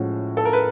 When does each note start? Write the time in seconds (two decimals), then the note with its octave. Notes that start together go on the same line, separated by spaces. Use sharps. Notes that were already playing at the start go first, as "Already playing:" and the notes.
Already playing: A2 F3 G#3 C#4 F#4
0.37 A4
0.45 A#4
0.53 B4